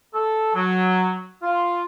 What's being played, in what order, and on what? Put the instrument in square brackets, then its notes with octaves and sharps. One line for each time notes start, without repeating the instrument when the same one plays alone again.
[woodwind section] A4
F#3
F4